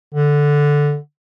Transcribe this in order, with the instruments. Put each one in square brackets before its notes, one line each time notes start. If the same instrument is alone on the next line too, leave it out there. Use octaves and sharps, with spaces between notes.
[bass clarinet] D3